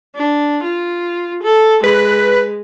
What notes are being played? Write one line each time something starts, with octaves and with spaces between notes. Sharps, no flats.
D4
F4
A4
G#3 B4